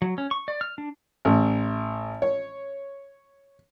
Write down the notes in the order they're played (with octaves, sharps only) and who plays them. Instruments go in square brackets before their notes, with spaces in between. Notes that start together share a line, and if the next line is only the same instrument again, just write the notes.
[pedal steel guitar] F#3
C#4
C#6
D5
F6
D4
[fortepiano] A1
C#5